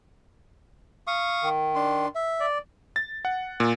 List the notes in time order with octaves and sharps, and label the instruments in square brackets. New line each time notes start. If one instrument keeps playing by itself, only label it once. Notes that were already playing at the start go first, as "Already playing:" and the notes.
[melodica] F5 C#6 D#6
[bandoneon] D#3
[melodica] D4 C6
E5
[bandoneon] D5
[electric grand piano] A6
F#5
A#2